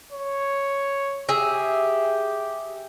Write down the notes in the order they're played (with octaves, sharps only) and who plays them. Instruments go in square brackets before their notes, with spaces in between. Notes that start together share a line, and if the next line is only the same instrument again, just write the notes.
[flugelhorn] C#5
[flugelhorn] G4 [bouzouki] G#4 E5